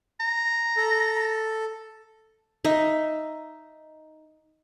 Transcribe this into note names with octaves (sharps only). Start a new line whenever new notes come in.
A#5
A4
D#4 E5